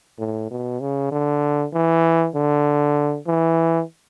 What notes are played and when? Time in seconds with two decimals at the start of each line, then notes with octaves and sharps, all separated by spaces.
0.19 A2
0.51 B2
0.80 C#3
1.11 D3
1.73 E3
2.35 D3
3.27 E3